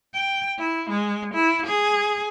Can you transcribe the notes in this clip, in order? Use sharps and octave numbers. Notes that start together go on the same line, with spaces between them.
G5
E4
G#3
E4
G#4